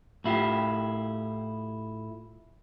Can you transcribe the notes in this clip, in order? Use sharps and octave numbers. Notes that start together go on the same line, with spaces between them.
A2 E4 F4 G4